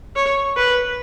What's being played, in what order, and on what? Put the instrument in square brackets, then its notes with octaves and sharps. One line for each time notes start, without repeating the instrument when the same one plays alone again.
[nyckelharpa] C#5
B4